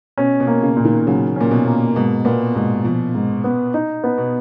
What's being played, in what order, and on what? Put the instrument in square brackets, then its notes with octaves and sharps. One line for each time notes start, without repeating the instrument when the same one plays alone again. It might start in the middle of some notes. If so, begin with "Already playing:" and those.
[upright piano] B2 [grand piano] C#4
[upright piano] B2
[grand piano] A#3
[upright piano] C#3
[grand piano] A#2
[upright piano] D#3
[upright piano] C#3 [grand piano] F#3
[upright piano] A#2 [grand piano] C#4
[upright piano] B2
[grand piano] A#3
[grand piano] G#2 [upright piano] B2
[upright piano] A#2 [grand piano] B3
[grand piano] G#2 [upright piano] B2
[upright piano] B2 [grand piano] F3
[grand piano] G#2
B3
D#4
B3
[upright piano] B2